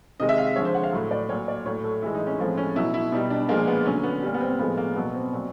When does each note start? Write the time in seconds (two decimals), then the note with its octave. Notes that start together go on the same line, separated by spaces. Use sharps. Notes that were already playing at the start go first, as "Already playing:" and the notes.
0.20 C3 D#3 G#3 D#5
0.29 E5
0.38 F5
0.56 D3 F3 G#3 C#5
0.65 C5
0.74 F#5
0.83 F5
0.93 A2 F#3
1.11 D5
1.29 A#2 F#3 C#5
1.48 D5
1.65 A2 F#3 C#5
1.84 A4
2.02 A2 E3 G#3 E4
2.15 D#4
2.27 C#4
2.39 A2 F3 G#3 C4
2.57 C#4
2.76 B2 F#3 E4
2.94 E4
3.12 B2 G3 D#4
3.30 D4
3.49 A#2 F3 G#3 A#3
3.67 B3
3.86 D3 F#3 C#4
4.03 B3
4.23 A#2 G3
4.34 B3
4.41 C4
4.59 A2 F3 G#3 B3
4.77 A#3
4.95 B2 F#3 B3
5.13 C4
5.32 A#2 F#3